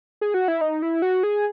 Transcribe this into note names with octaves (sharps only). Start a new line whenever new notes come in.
G#4
F#4
E4
D#4
E4
F#4
G#4